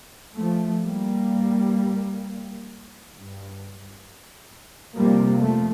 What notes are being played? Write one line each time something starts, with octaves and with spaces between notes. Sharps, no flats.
F3 A3
G3 A#3
G2
G2
F2 C3 G3 A#3
F3 A3